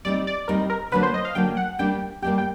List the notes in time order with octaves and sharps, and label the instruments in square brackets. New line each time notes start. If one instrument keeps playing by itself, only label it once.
[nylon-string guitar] G3 C4 D#4 [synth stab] D5
[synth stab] D5
[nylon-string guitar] G3 C4 D#4 [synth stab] A#4
[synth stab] A#4
[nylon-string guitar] D3 F#3 A#3 D4 [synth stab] B4
[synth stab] C5
D#5
F5
[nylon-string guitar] D3 F#3 A#3 D4 [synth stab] G5
[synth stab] F#5
[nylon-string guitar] G3 A#3 D4 G4 [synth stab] G5
[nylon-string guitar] G3 A#3 D4 G4 [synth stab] G5
[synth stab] G5